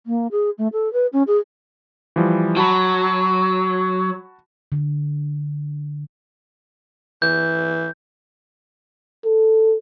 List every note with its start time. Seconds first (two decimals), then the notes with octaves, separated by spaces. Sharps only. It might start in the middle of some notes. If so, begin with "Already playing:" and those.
0.06 A#3
0.31 G#4
0.58 A3
0.73 A4
0.93 B4
1.13 C#4
1.27 G#4
2.16 E3 F3 G3
2.57 F#3 F#4 A5 B5
4.72 D3
7.22 E3 G6
9.25 A4